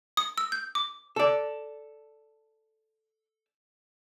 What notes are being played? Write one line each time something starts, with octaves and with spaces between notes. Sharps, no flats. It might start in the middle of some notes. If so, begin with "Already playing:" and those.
D#6
E6
G6
D6
A4 D5